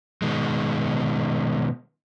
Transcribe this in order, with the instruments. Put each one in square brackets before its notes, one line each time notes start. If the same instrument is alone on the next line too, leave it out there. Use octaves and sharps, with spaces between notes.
[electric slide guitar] B2 D#3 G#3